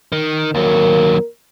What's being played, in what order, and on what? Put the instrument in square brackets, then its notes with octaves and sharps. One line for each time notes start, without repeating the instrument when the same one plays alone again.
[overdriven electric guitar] D#3
[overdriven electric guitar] D#2 F#3 [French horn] A#4